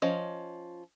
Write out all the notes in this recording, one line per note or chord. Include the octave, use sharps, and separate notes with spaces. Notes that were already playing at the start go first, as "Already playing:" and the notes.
F3 C#4 D#5